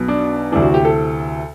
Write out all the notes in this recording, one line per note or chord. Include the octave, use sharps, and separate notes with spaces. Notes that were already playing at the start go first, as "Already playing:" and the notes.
Already playing: B1 B2 F#3
D4
D2 C3 E3 D4
F#4
G4
A4